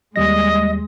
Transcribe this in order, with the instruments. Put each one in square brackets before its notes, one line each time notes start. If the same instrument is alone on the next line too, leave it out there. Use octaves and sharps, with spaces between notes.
[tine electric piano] D#2 G3 A#6 [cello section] G#3 [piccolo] D#5